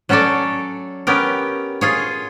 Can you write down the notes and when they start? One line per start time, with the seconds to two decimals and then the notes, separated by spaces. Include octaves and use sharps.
0.09 F#3 C#4 A4 C#5 D5
1.07 B3 C#4 G4 A#4
1.81 F4 G#4 C#5